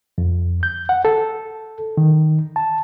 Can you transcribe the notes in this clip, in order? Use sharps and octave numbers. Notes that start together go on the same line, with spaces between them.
F2
G6
F#5
A4
D#3
A5